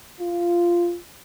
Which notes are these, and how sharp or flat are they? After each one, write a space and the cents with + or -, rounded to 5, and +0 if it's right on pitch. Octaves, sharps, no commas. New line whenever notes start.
F4 -10